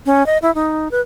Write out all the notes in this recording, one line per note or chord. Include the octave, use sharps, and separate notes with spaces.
C#4
D#5
E4
D#4
B4